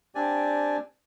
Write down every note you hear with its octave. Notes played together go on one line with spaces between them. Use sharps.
C4 D4 G4 D5 G#5